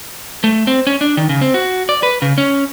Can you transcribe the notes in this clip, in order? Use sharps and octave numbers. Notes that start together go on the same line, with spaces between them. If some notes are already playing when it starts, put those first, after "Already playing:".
A3
C4
C#4
D4
D#3
C#3
C4
F#4
D5
B4
C#3
C#4